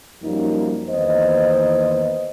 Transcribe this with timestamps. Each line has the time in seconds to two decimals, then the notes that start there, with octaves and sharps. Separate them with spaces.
0.22 F#2 F3 G3 A#3 D#4
0.89 E2 D#3 A#3 B3 C5 D#5